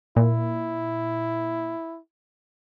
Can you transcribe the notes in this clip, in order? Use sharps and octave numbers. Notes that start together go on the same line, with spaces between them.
A#2 E4